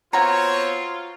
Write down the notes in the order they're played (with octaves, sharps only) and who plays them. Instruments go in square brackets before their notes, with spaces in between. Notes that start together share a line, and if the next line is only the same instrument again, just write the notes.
[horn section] B3 C4 C#5 [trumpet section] F4 [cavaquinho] F#4 A#5